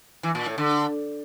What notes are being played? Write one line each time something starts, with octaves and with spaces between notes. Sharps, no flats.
E3
A#2
A2
D3